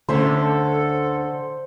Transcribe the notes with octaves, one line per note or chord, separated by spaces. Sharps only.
D2 D3 C#4 A4 C5 E5